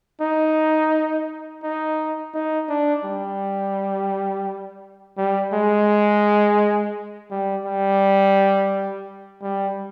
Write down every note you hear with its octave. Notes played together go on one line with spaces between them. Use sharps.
D#4
D#4
D#4
D4
G3
G3
G#3
G3
G3
G3